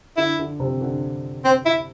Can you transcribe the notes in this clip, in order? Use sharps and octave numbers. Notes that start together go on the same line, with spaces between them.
D3 E4
D3
C3
D3
C4
E4